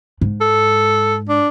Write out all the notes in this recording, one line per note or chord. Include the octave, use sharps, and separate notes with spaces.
G#2
A4
D4